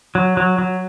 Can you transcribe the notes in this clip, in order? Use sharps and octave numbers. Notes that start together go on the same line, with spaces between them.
F#3
F#3
F#3